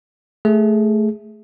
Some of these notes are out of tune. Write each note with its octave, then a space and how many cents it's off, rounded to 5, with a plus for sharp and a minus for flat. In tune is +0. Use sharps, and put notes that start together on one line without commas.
A3 -10 G#4 +0